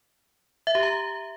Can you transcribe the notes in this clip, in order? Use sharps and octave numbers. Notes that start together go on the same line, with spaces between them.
E5
G4
A#5